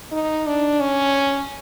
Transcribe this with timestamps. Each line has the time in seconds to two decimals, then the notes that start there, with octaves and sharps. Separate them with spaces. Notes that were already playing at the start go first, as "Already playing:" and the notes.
0.11 D#4
0.47 D4
0.80 C#4